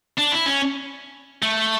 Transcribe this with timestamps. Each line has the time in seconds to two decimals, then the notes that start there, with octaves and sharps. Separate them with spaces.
0.18 D4
0.32 E4
0.46 C#4
1.42 A3